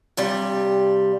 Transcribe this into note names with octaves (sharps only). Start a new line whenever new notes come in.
G2 C3 G3